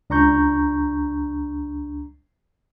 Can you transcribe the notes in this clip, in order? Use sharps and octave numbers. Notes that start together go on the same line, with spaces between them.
C#2 D4 A#5 C#6 G6